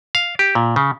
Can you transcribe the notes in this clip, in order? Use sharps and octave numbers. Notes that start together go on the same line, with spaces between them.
F5
G4
A#2
C#3